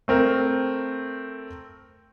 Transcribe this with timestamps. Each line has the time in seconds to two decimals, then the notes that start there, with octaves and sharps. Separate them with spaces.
0.08 A3 C4 A#4